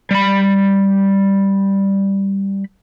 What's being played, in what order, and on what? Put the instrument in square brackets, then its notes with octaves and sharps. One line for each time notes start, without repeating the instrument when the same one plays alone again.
[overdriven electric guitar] G3 B5